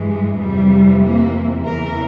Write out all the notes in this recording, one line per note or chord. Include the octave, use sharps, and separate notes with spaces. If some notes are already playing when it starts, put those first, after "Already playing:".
Already playing: G2 E3 G#3
F2 C3 E3 G3
A#3
E2 C#3 E3 A#4